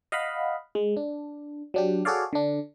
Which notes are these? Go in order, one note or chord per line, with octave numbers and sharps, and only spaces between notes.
D#5 F5 F#5 B5
G#3
D4
F#3 D4 G4
F#4 G#4 A4 C#5 D5 F5
D3 D4